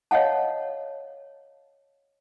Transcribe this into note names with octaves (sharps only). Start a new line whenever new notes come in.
C#5 D#5 F5 F#5 A5